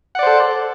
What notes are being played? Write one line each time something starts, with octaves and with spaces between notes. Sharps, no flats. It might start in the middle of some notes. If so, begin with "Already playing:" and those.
A4 C5 D5 F#5